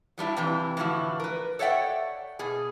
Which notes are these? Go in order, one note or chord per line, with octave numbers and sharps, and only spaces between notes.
F#3 G3 D4 E4
F2 C3 E3
A2 D3 E3 F3 F#4
A#4 B4
A4 C#5 D5 E5 F#5 G5
B2 G#4